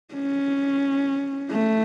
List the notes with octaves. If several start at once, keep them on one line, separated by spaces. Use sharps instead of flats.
C#4
A3